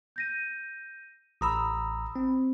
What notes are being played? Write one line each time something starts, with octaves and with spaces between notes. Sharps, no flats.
G6 A#6 D#7
A1 A#5 B5 D#6 E6
C4